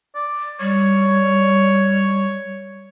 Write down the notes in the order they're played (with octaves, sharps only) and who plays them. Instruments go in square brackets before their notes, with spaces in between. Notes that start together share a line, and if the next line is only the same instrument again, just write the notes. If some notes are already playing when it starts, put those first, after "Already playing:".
[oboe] D5
[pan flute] G3 [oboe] C#5